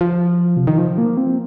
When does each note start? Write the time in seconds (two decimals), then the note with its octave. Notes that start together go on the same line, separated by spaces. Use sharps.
0.01 F3
0.57 C3
0.67 D#3
0.78 F3
0.98 A#3
1.17 C4